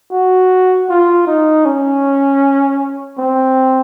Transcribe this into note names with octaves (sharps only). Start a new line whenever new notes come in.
F#4
F4
D#4
C#4
C4